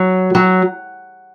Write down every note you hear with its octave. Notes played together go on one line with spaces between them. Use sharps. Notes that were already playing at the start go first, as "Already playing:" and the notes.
Already playing: F#3
F#3